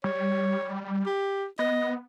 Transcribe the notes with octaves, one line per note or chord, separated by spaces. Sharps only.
G3 C#5
G4
B3 D#5